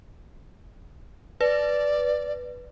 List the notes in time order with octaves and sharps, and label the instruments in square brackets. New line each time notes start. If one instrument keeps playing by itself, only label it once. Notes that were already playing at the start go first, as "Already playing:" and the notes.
[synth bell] B4 [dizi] D5